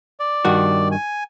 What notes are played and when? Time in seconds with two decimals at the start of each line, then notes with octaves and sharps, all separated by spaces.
0.20 D5
0.45 G2 D#3 F#4
0.92 G#5